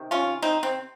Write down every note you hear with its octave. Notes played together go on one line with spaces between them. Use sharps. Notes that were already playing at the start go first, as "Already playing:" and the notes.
Already playing: C3 D#3
C#4 F4
C4 D#4
C4